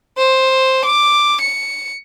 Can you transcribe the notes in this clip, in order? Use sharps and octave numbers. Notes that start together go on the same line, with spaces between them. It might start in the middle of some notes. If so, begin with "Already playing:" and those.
C5
D6
C#7